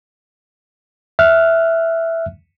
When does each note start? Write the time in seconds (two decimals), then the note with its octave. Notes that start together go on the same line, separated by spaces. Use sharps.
1.19 E5 F6 F#6